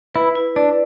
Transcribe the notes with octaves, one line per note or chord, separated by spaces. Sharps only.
E4 B4
E4
D4 D5